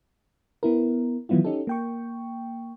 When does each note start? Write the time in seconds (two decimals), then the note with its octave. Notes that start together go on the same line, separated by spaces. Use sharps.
0.63 B3 E4 A#4
1.29 D#3 E3 F#3 B3 E4 F4
1.44 C#4 D#4 G4 A4
1.67 A#3 G5 C#6